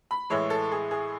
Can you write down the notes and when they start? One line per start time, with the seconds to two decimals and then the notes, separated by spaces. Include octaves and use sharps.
0.11 B5
0.30 A2 E3 G#3 C#5
0.50 A4
0.72 G#4
0.91 G#4